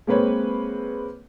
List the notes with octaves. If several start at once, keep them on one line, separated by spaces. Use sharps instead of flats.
G#3 A#3 C4 B4 C#5